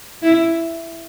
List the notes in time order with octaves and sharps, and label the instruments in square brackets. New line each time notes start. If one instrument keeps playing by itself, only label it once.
[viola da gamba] E4